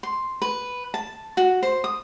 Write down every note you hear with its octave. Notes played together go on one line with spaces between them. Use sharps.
C6
B4
A5
F#4
C5
D#6